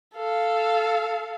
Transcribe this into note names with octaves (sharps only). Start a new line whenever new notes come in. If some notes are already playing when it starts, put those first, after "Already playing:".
A4 F5